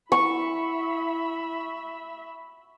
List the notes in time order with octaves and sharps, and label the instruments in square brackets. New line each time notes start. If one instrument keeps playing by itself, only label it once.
[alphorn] E4 [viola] E5 B5 [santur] C#6